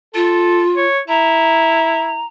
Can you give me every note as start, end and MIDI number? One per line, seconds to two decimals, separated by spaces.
0.14 0.84 65
0.14 0.63 69
0.76 0.99 73
1.08 2.22 64
1.08 2.24 82